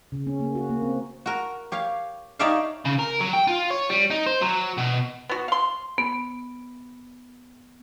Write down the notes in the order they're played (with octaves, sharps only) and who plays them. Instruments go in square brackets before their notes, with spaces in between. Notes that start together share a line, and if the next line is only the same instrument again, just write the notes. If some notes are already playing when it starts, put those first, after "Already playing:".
[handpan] C#3
C#4
A#3
F#4
A#3
C4
[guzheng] F#4 A#4
G4 C#5 F5
D#4 G4 C#5 D5 E5 F5
[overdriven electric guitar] C#3
A#4
F#3
G5
F4
C#5
G3
D#4
C5
F#3
B2
[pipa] B3 F#4
F5 C6
[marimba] B3